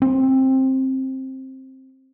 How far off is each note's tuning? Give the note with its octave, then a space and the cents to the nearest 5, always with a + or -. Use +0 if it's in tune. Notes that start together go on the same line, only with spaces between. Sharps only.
C4 +15